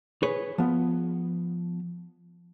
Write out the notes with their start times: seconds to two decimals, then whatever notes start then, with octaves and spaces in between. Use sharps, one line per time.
0.23 G#4 B4 C#5
0.58 F3 B3